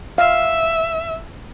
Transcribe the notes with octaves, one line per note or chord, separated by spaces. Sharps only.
E5 F5